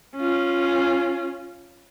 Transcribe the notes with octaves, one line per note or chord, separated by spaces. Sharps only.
C#4 F4